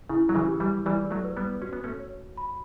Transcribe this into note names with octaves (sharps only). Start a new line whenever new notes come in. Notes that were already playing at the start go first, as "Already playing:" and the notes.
C#3 E4
F#3
C#3 E3
G4
E3 G3
E3 G3 D5
F#3 A3
B4
G3 B3
C#4 F#4
B3
A3 C#4
C#5
B5